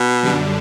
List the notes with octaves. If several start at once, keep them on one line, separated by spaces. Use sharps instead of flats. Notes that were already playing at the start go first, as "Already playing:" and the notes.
Already playing: B2
F#2 D3 G3 D4